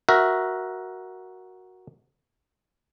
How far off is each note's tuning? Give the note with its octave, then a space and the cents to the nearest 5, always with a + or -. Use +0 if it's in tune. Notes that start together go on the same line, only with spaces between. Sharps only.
F#4 +0 A#4 +10 E5 +0